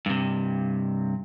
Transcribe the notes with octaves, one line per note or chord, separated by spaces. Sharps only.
G2 C3